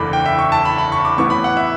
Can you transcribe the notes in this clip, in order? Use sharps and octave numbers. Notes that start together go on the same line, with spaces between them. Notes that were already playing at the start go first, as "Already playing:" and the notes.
Already playing: F#1 E2 D3 A3 B5 D6
G5
E5
C#6
A5
B5
B5
C#6
D6
A1 A2 E3 B3 C#6
B5
F#5
E5